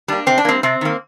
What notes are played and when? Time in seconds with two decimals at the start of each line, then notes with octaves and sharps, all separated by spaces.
0.08 G3 A#3 D4
0.26 C3 C4
0.38 D4
0.45 G3 A#3 C4
0.63 C3 C4
0.81 D#3 A#3